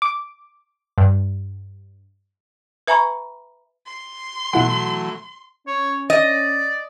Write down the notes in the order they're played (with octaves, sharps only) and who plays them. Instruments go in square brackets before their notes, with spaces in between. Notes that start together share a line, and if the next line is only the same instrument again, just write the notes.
[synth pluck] D6
G2
[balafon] B4 E5 G#5 A#5 B5 C#6
[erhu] C6
[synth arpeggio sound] B2 E4 F#5 [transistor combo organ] E3 F#3 A3
[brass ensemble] C#4 [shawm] C#5
[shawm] D5 [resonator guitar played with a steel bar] D#5